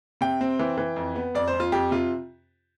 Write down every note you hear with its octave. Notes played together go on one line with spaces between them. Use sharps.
C3 G5
C4
E3
E3
F2
B3
F2 D5
C5
F2
F4
F2 G4
C3 F4